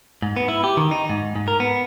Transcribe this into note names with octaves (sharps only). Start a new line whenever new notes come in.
G#2
B3
E4
G4
D#3
D#4
G#2
G#2
A#4
B3